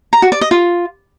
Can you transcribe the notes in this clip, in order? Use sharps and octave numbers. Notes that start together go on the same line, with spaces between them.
A#5
F#4
D5
D#5
F4